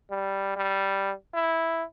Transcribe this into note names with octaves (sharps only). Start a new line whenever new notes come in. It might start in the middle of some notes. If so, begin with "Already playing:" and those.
G3
G3
E4